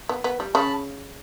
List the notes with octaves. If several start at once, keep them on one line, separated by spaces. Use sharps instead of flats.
B3
B3
G3
C#3 C#4 A5 B5